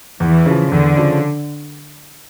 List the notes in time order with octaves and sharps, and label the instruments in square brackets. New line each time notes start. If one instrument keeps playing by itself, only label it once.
[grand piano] E2 [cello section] E3
[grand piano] C#3 F3
[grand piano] E2 [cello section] D3
[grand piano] C#3 F3